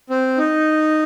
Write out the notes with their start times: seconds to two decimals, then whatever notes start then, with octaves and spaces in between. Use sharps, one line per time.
0.10 C4
0.38 D#4